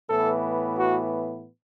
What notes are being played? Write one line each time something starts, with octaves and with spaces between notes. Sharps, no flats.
A2 E3 B3 A4
F#4